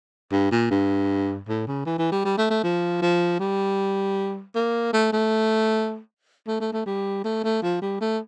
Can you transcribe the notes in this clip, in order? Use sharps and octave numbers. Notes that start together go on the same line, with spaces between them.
G2
A#2
G2
A2
C#3
E3
E3
G3
G3
A3
A3
F3
F3
G3
A#3
A3
A3
A3
A3
A3
G3
A3
A3
F3
G3
A3